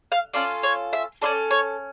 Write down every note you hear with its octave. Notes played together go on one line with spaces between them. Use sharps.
F5
C#4 F4 A4 D5
C#5
E5
C#4 F4 A4 D5
C#5